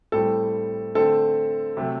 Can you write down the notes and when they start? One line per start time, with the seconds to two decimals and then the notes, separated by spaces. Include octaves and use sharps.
0.12 A2 G3 C4 A4
0.95 D3 A3 C4 A4
1.77 C3 F#3 A3 C4